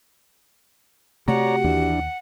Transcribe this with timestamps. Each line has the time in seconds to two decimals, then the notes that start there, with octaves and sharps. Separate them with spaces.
1.28 C3 A3 F#4 G4 C#5 D5 F#5 A#5
1.64 D#2 E3 D4